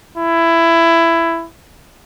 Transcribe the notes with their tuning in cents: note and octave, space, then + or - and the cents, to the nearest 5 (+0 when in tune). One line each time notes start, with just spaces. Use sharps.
E4 +15